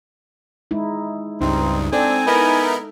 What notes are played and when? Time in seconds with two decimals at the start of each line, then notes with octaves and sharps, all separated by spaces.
0.71 G#3 D#4 E4
1.41 C#2 G2 C4 D#4
1.93 C4 D4 A4 G#5
2.27 B3 D#4 E4 A#4